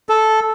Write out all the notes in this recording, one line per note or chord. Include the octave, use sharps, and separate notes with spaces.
A4